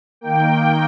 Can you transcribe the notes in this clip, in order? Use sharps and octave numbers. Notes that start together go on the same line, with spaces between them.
D#3 A#3 G5